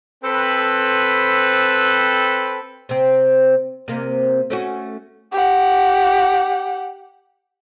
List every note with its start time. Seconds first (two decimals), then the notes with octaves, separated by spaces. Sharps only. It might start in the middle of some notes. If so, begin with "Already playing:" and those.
0.24 C4 A4 B4
2.89 C3 C4
3.88 C3 A#3
4.50 A3 C#4 F#4
5.33 G4 F#5